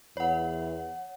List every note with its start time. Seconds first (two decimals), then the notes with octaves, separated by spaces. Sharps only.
0.17 E2 C#5 F#5